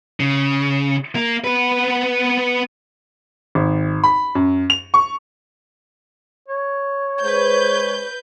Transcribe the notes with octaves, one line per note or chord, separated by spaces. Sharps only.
C#3
A#3
B3 B4
G#1
B5
F#2
F7
C#6
C#5
G#3 G#4 B4 C5 G6